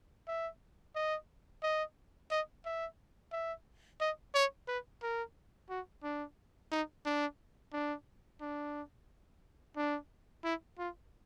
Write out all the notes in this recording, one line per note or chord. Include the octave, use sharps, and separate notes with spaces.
E5
D#5
D#5
D#5
E5
E5
D#5
C#5
B4
A#4
F#4
D4
D#4
D4
D4
D4
D4
E4
F4